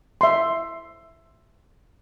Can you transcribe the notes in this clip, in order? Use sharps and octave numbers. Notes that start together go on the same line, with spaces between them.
E5 C6